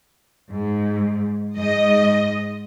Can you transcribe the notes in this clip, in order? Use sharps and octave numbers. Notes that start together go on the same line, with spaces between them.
G#2
G#2 D#5